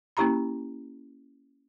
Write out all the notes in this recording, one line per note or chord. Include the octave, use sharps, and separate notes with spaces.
A#3 C#4 E4 G4 A#5 B5